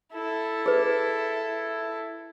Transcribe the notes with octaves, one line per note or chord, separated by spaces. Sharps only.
E4 A4
G#4 B4